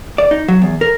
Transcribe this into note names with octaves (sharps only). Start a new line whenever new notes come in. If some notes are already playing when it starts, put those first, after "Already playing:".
D5
D#4
F#3
E2
A#4